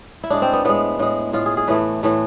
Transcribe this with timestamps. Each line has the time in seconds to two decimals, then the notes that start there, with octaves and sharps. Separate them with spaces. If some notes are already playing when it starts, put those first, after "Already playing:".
0.23 E4
0.30 A2 G#3 D4
0.42 C4
0.53 B3
0.65 A2 G#3 B3
0.99 A2 G#3
1.33 A2 G#3 F4
1.46 G#4
1.57 G#4
1.68 A2 E3 A3 B4
2.03 A2 E3 A3